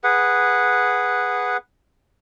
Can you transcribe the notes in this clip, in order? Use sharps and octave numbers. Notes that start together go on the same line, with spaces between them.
G#4 B4 F#5